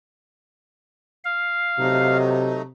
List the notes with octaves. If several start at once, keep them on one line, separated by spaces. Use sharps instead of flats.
F5
C3 F#3 A3 D#4